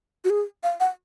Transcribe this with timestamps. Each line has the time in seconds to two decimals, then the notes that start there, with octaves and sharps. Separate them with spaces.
0.25 F#4
0.30 G#4
0.63 F5
0.80 F#5